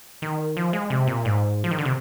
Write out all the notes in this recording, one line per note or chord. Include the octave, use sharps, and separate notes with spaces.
D#3
F3
G#3
C3
A#2
G#2
F3
D#3
D3
C3